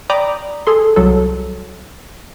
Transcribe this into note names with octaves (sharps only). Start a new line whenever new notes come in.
D5 G5 A#5 B5 D6 D#6
G#4 A4 C6
C2 F#3 A4